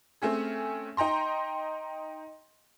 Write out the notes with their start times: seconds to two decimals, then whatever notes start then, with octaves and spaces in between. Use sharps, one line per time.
0.22 A3 C4 C#4 G#4
0.97 D#4 G5 A#5 C6